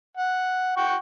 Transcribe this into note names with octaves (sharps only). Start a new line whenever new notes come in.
F#5
F#5 G5 C#6